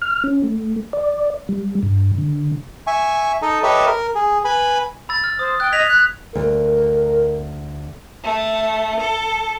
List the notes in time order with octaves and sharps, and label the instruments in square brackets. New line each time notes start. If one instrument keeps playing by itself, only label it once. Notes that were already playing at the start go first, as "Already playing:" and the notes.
[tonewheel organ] F6
C#4
A3
D5
G3
G2
D3
[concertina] E5 G#5 C#6
D#4 A4 D#5
G4 A4 B4 C#5 D#5 E5
A#4
G#4
B4 G#5 B5
[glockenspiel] B5 E6 A6
F6
[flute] C5 [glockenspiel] D#6
[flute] G5 [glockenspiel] F#6
[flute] D#5 [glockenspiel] G#6 B6 F7
[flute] F#6
[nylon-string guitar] D2 [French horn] A#4
[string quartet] A3
A4